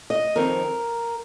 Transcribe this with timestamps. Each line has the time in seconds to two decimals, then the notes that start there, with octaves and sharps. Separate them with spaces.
0.10 D#5
0.35 F2 D#3 C4 A#4